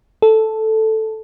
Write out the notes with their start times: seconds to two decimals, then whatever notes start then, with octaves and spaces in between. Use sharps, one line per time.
0.22 A4